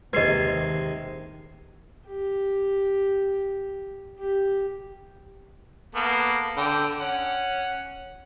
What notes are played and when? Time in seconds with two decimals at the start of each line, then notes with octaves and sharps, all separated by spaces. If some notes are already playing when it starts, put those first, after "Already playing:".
0.13 D#2 C3 D#3 G#3 B4 D#5 G#6 C7
2.07 G4
4.19 G4
5.95 A#3 B3 A4
6.57 D3 G5
6.99 C#4 F#5